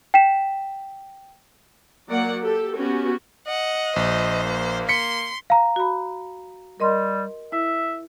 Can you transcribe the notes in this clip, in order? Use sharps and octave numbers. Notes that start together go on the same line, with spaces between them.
G5 B6 E7
F#3 A#3 D5 F#5
G4 A4
B3 C#4 F#4 G4
D#5 F#5
A#1 C5
A#3
C6 B6 C#7
F5 A#5
F#4 B5
G3 A#4 D#5 C6
E4 E5